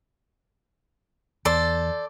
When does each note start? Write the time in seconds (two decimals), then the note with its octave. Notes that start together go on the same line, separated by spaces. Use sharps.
1.45 E2 A4 C5 D5